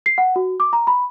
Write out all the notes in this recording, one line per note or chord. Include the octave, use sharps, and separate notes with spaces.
C7
F#5
F#4
D6
A#5
B5